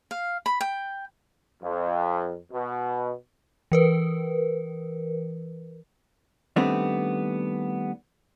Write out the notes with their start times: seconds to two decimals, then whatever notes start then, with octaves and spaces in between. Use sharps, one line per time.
0.11 F5
0.46 B5
0.61 G5
1.63 F2
2.53 B2
3.72 E3 A#4 B4
6.56 D#3 G3 A3 B3 C4 D4